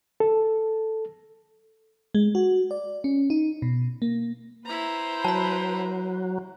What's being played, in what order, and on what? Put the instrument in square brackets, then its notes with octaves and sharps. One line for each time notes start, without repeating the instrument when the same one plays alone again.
[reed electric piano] A4
[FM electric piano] G#3
F#4
D5
C#4
D#4
B2
A#3
[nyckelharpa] E4 A#5 [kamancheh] B4 C5
[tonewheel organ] F#3 [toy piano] A5 B5